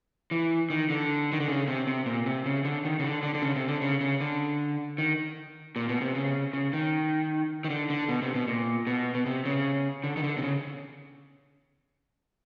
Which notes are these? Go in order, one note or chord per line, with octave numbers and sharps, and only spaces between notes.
E3
D#3
D3
D#3
D3
C#3
C3
C3
A#2
C3
C#3
D3
D#3
C#3
D3
D3
D3
C#3
C3
D3
C#3
C#3
D3
D#3
A#2
B2
C3
C#3
C#3
D#3
D#3
D3
D3
B2
C3
B2
A#2
B2
B2
C3
C#3
D3
D#3
D3
C3
C#3